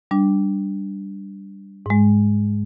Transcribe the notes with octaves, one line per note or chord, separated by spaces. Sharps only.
G3 D4
G#2 G#3